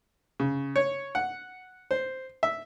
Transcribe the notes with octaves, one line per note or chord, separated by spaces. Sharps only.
C#3
C#5
F#5
C5
E5